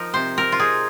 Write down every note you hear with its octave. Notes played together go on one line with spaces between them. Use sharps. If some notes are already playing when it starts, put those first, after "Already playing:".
Already playing: F3 D#4 A#4
C3 C5
C4 A#4
F4
D#4 G#4